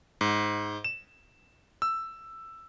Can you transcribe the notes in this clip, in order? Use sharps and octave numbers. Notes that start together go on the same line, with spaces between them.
G#2
E7
E6